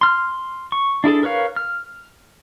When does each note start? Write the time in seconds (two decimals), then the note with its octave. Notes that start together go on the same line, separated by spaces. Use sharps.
0.01 C6 F6
0.72 C#6
1.04 D4 E4 G#4 A4
1.23 A#4 B4 C#5 F5
1.56 F6